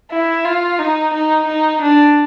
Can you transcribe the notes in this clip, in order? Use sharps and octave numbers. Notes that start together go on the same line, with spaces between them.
E4
F4
D#4
D#4
D#4
D4